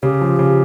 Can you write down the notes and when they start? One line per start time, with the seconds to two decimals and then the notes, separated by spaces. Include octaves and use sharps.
0.03 C#3 G4
0.21 F3
0.39 C#3